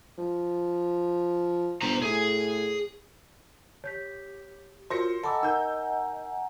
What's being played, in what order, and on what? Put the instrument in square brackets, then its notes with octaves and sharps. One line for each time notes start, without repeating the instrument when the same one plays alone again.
[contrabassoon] F3
[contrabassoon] G1 [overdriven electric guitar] C5 A#5
[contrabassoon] A2 [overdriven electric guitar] G#4
[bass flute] G4 [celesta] C#5 G6 B6
[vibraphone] F4 [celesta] F#4 A#4 C#5 [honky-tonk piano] C5 A#6 C#7
[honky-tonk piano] A4 [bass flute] D#5 [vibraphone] F#5 G#5 A#5 [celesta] B5 D6 E6
[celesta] D#4 A#4 [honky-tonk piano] E6 G6